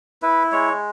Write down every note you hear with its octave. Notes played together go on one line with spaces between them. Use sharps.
E4 B4
G#3 C#5